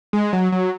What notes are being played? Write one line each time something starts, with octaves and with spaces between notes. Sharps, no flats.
G#3
F#3
F#3